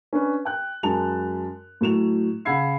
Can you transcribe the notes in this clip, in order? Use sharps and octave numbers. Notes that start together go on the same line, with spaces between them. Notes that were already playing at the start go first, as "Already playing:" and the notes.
C#4 D4 B4
G5 F#6
F#2 G#3 A5 F7
A2 F#3 E7 F7
C#3 F#5 B5 E6 G#6 C7